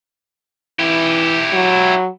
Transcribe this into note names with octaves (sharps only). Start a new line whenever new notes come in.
E3 E4 G4
F#3